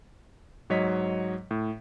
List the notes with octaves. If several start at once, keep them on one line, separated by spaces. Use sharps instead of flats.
G#2 F#3 C#5 D#5 B6
A2